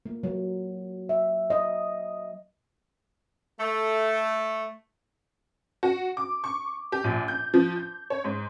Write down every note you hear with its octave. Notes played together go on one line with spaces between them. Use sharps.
A#3
F#3
E5
D#5
A3
F#4
D6
C#6
G4
A#1
G6
F3
G6
C#5
G#2